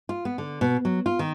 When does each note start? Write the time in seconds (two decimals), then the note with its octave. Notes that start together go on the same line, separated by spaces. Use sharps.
0.09 F4
0.25 B3
0.38 D3
0.61 B2
0.85 F#3
1.06 F4
1.19 D#3